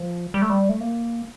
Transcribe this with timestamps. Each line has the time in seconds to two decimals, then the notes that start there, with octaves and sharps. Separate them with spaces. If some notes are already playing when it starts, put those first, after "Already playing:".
Already playing: F3
0.34 G3
0.42 A3
0.50 G3
0.69 A3
0.81 A#3